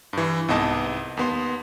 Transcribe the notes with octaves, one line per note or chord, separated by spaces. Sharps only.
G2 E3
C2 G#2 B3 D#5 A5
D#2 B3 C6